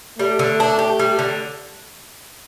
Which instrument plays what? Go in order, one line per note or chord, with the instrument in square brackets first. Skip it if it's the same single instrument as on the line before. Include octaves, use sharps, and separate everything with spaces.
[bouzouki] G3 [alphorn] A3
[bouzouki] D3
D4
G4
G3
D3